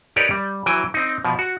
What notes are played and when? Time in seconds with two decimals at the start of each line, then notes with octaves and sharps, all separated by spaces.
0.16 D#4 G4 A#4 B4 C#5 D5
0.31 G3
0.66 E3 F#3 G5 G#5
0.94 C4 D#4
1.24 B2 F3
1.39 F#4